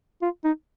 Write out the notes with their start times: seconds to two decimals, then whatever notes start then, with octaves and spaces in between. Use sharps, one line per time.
0.22 F4
0.44 D#4